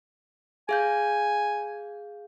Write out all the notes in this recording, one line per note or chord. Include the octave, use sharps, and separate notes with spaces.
G#4 F5 G#5 G6